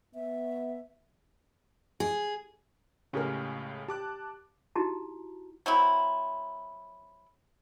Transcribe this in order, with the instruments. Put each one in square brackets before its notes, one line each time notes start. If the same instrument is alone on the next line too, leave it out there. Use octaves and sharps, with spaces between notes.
[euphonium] B3 [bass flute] E5
[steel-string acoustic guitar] G#4
[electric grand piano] C#2 A2 C#3 [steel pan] C#4 G4 A#4
[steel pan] G4 [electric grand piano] A5 D6 F#6
[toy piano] D#4 E4 F#4 G4 A5 A#5
[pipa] F#3 C4 E4